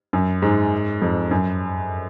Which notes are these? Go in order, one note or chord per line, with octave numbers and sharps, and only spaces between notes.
F#2
G#2
F2
F#2